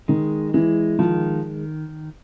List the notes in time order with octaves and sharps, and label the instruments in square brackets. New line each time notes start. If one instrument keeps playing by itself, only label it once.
[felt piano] D#3 [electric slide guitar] G#3
[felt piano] E3 [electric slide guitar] G#3
[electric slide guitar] D#3 [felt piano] F3